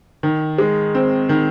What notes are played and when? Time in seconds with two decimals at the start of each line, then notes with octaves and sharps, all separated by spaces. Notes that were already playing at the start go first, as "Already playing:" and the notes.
0.23 D#3
0.58 G#3
0.95 C4
1.29 D#3